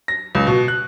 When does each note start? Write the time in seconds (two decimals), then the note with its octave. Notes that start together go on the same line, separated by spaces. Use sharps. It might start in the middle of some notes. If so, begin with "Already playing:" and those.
0.08 A#6
0.35 C#2
0.47 B2
0.68 F#6